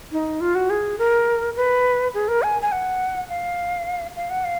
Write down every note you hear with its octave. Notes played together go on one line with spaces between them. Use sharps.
D#4
F4
F#4
G#4
A#4
B4
G#4
A#4
G#5
G#5
F#5
F5
F5
F#5
F5